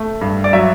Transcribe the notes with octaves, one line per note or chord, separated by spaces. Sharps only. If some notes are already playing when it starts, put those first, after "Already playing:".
Already playing: A3
G2
D5
F#3 E5